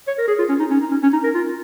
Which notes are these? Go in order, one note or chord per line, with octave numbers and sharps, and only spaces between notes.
C#5
A#4
G#4
F4
C#4
D#4
C#4
D#4
C#4
C#4
D#4
A#4
F4